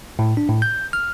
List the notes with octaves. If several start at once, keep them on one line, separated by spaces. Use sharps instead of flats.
A2
D4
A2
G6
F6